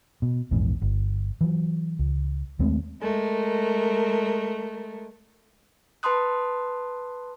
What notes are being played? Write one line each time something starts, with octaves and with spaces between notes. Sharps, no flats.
B2
A#1 E2 G#2
G1
E3 F#3
C#2
D#2 G#3 A3 C4
G#3 A3 A#4
B4 A5 B5 C6 D#6 F#6